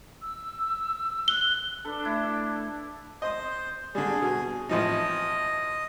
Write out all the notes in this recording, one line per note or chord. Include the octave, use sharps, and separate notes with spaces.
E6
F#6 G7
D4 A4 B4
A3 E4
C5 D#5 D#6
D3 G3 G#4
B2
A1 F3 D#4 D#5